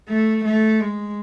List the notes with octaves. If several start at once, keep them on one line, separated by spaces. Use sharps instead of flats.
A3
A3
G#3